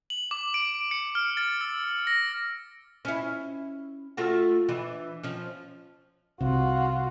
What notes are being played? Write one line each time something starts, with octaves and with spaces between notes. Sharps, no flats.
F#7
D6
D7
C#7
F6
A6
E6
A#6
C#4 E4
A3 F4 F#4
E3 D4
F3 C#4
C2 C3 F4 F#4